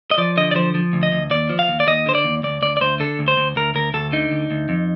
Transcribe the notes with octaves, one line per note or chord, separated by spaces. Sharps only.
D#5
F3 D5
D3 D#5
D5
F3 C5
F3
D2
D#5
D2
D#2 D5
F3
F5
D#2
D5
D#2 D#5
D3 C5
D5
D#2
D2 D5
D2 D5
D5
D2 C5
D3 A4
D2
C5
D2
D2 A#4
D2 A#4
D2 A4
D3 D#4
D2
D2
F2